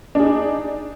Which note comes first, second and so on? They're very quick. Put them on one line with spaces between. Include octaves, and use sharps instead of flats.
D4 G#4 D#4